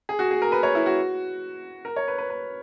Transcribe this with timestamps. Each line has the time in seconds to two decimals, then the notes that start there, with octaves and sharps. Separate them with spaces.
0.09 G#4
0.19 F#4
0.31 G#4
0.42 A#4
0.52 B4
0.63 C#5
0.75 E4
0.86 F#4
1.85 A#4
1.96 C#5
2.08 B4
2.18 B4
2.30 B4